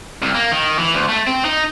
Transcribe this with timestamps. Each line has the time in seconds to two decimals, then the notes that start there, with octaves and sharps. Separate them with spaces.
0.22 C2
0.35 A#3
0.52 D#3
0.79 E3
0.94 D2
1.09 A3
1.27 C4
1.45 D#4